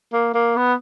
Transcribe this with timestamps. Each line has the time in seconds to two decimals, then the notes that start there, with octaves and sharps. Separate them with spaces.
0.13 A#3
0.34 A#3
0.56 B3